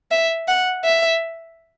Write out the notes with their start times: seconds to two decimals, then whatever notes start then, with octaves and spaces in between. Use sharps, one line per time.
0.11 E5
0.48 F#5
0.84 E5